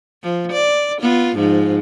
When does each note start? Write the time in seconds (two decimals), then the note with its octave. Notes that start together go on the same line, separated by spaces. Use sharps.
0.23 F3
0.52 D5
1.01 B3 F4
1.36 G#2 F3